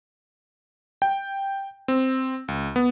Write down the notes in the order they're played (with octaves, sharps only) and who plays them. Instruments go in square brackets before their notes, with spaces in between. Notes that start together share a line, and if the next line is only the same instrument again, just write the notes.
[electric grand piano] G5
C4
C#2
B3